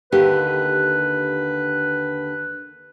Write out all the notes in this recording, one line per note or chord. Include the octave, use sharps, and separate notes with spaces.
D#2 D3 G4 B4